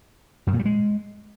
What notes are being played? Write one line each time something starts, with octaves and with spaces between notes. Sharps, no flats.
F#2
A#2
G3
G#3